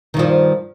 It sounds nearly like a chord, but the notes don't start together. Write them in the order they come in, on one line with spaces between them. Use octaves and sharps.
D#3 G2 F3